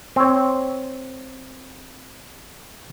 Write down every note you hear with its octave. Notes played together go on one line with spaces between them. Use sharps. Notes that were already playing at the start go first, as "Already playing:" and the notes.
C4 C#5